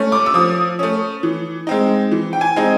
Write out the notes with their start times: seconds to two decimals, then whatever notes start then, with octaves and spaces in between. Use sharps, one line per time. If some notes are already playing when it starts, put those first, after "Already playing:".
Already playing: A3 C#4
0.12 D6
0.26 E6
0.34 F3 D#6
0.79 A3 C#4
1.23 E3
1.67 G#3 C4 D#4
2.12 E3
2.33 G5
2.41 G#5
2.56 G#3 C4 D#4